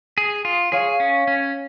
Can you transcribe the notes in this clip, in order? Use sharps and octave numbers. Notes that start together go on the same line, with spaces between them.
G#4
F4
G#4 C#5 F5
C#4
C#4